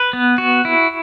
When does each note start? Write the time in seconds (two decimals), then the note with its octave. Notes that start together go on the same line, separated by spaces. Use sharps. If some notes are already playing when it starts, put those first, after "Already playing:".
Already playing: B4
0.13 B3
0.38 F#4
0.65 E4